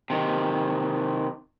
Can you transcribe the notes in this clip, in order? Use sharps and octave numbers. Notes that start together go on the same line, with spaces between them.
C3 D#3